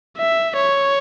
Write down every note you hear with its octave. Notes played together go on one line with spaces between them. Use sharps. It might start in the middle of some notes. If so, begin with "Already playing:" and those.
E5
C#5